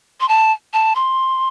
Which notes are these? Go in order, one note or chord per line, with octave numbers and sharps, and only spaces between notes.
C6
A5
A5
C6